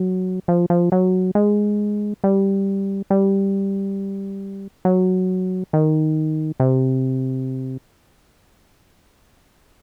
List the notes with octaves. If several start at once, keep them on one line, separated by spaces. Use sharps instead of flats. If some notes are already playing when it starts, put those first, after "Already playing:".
Already playing: F#3
F3
F3
F#3
G#3
G3
G3
F#3
D#3
C3